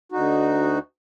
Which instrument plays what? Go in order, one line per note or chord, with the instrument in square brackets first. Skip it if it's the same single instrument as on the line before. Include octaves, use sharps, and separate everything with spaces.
[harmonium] D2 D#4 F#4